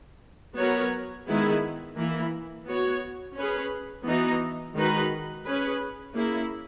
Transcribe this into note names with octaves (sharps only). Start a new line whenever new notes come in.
F#3 B3 F#4 A#4 C#5
D#3 G#3 B3 E4 G#4
E3 A#3 E4
B3 F#4 C#5
C#4 G#4 B4
E3 B3 D#4 F#4
D#3 G#3 D#4 F#4 B4
C#4 G#4 B4
A#3 C#4 E4 G#4